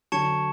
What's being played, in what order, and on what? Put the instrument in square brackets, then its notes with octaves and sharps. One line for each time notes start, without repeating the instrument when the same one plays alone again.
[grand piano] D3 F#3 [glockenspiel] A5 C#6 G#6 C#7 E7